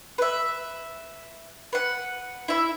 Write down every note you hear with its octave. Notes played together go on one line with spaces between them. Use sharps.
B4 E5
B4 F#5
E4 E5 B5